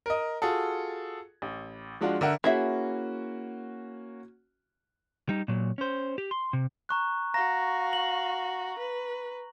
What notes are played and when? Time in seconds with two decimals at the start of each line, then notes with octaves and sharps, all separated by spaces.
0.06 A#4 D#5
0.42 F4 F#4 G#4 A4
1.42 A1
2.01 F3 G#3 D4 F4 F#4
2.21 D3 A#4 E5 F#5
2.44 A#3 C#4 E4 F#4 G#4 E5
5.29 G3 D#4
5.48 A#2 F#3
5.78 C#4 C5
6.18 G4
6.31 C6
6.53 C3
6.89 A#5 C#6 F#6
7.34 F#4 F5 A#5 A#6
7.93 F#7
8.79 B4